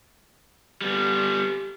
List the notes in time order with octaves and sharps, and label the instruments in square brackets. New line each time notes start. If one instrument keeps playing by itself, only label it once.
[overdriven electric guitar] G3 B3